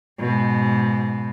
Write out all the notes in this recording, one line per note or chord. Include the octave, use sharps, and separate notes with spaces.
G#2 B2